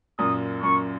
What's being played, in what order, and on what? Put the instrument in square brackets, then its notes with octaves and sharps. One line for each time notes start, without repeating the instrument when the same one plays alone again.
[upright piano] F#2 A#2 [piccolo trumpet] D#6
[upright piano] F#2 [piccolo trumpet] C#6